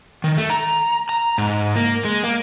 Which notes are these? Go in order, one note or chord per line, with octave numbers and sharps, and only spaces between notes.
D#3
A3
A#5
A#5
G#2
A#3
G#3
A#3